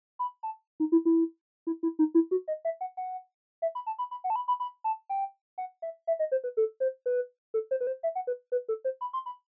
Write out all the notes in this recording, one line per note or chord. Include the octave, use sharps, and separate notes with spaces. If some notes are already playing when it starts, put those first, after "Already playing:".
B5
A5
D#4
E4
E4
E4
E4
D#4
E4
F#4
D#5
E5
F#5
F#5
E5
B5
A5
B5
B5
F#5
A5
B5
B5
B5
A5
G5
F#5
E5
E5
D#5
C5
B4
A4
C5
B4
A4
C5
B4
C5
E5
F#5
B4
B4
A4
C5
B5
C6
B5